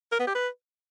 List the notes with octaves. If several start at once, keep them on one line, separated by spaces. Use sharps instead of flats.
A#4
B3
G4
B4